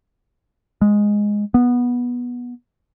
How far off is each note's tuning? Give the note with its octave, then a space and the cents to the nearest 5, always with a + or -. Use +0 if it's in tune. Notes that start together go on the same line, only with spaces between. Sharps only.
G#3 -5
B3 -15